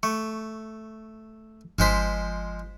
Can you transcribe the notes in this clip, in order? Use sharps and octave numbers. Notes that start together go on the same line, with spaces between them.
A3 C#6
G1 F3 G#3 C5 B6